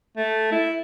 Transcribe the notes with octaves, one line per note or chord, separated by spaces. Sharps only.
A3
E4